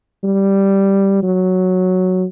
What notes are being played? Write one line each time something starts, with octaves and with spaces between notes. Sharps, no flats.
G3
F#3